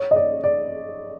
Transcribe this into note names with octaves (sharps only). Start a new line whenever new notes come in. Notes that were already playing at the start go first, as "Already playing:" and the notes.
Already playing: C#5
D#5
D5
D5